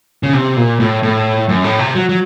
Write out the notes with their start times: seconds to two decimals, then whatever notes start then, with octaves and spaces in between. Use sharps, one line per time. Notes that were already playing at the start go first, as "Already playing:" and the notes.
0.23 C#3
0.34 C3
0.57 A#2
0.80 A2
1.03 A2
1.49 F#2
1.64 A2
1.79 C3
1.95 F#3
2.09 F#3